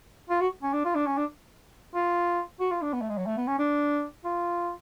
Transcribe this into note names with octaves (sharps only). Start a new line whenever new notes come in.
F4
F#4
C#4
D4
F4
D4
C#4
D4
F4
F#4
F4
D4
B3
A3
G#3
F#3
A3
B3
C#4
D4
F4